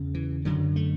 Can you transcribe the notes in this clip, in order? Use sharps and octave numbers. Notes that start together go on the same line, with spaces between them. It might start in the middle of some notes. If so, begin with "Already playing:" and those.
Already playing: E2 C#3
E3
F#2 D3 F#3
A3